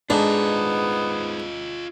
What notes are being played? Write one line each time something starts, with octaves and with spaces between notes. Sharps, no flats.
G#2 B3 D4 F4 G#4 A4 D#5